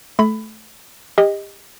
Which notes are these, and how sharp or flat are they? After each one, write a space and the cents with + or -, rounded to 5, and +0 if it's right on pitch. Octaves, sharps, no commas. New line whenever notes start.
A3 -15 B5 +15
G4 +30 D#5 +0